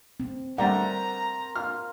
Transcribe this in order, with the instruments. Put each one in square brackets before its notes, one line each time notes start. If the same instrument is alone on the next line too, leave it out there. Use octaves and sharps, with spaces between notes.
[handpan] C4
[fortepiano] D3 G3 A3 [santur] A#4 C5 [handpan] F#5 [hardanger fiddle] A#5
[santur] F4 [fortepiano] F6